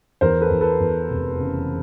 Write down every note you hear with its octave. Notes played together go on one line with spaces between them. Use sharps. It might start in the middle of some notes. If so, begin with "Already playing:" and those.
E2 A#4 C5
A4 B4
E2
A4 B4
E2
F1
C#3